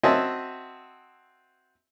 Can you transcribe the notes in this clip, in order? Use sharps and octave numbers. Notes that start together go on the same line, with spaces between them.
C4 F#4 D#5 E5 G#5 A5